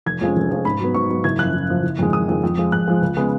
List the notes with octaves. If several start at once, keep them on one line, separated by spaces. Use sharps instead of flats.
F1 G#6
F2 F3 G#3 C#4
F1
F2 F3 G#3 C#4
G#2 B5
F#3 B3
G#2 C#6
F#3 B3
F#1 G#6
F#2 F3 F#6
F#1
F#2 F3
F#1
F2 D#3 G#3
F#1 D#6
F2 D#3 G#3
F2
F3 G#3
F2 F#6
F3 G#3
C#2
C#3 G#3 B3